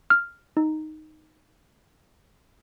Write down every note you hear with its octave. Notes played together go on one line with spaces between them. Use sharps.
F6
D#4